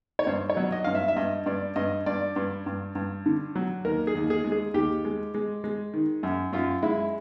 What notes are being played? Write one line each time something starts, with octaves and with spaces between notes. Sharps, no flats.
C#5
G2 C5
C#5
F#3
D#5
G2 F5
E5
E5
G2 D#5
G2 D5
G2 D#5
G2 D5
G2
G2
G2
D3
F#3
D#2 A#4
G#4
D#2
G#4
G#3
G#4
D#2 G4
G#3
G#3
G#3
D#3
F#2
F#2 F4
G#3 E4